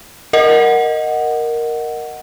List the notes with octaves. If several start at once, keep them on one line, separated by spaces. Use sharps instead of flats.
A#4 D#5 F#5